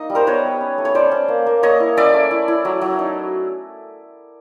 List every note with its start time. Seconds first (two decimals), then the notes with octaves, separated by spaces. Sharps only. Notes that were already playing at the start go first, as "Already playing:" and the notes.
Already playing: A#3 D#4 D#5
0.10 G3
0.15 A#4 C5
0.27 B3 B4 C#5
0.45 G3
0.61 C#4
0.78 A3
0.85 C#5
0.95 C#4 C5 D5
1.11 C#4
1.28 A#3
1.47 A#3
1.63 A#3 C#5 D#5
1.80 E4
1.97 C#4 D5 E5
2.14 A3
2.31 E4
2.48 E4
2.65 F#3
2.81 F#3
2.99 D#4